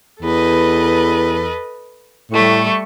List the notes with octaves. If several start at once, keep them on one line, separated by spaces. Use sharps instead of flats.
E2 A4 B4 D#5
A2 G3 A3 C#6